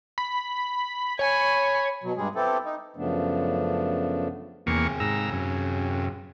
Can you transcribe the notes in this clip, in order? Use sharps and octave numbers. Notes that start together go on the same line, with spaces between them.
B5
C#5 G#5 B5
B2 F#3
G2 G3 G#3 G#4
B3 C4 E4 G4 A4
D#4
F#2 C#3 F3 A3 B3 D4
E2 C3 A#3 G#4 C#6
G#2 A#5 E6
F#2